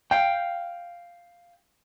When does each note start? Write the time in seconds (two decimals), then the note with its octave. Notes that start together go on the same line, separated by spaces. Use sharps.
0.11 F5 G5